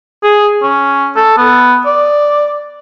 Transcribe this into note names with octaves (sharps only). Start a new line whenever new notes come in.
G#4
C#4
A4
B3
D5